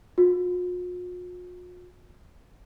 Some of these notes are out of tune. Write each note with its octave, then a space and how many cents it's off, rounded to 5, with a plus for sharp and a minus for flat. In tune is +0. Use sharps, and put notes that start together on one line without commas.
F4 +45